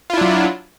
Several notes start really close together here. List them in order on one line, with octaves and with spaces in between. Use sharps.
F4 E4 D4 F#3